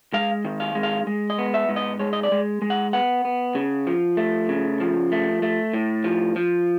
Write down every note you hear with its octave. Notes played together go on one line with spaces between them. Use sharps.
G#3 F5
D#3
F5
G#3
F5
G#3
D#5
B3
E5
G#2
D#5
G#3 C#5
D#5
D5
G#3
G#3
F#5
B3 F#5
B3
C#3
F3
A3
C#3
F3
A3
A3
A2
F3
F3